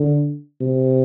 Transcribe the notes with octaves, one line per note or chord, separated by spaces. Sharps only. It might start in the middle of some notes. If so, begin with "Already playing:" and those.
Already playing: D3
C3